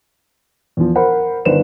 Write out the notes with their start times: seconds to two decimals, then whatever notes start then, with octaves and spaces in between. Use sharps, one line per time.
0.77 E2 F3
0.95 A#4 C5 F#5 B5
1.45 G1 D#3 B4 C5 E7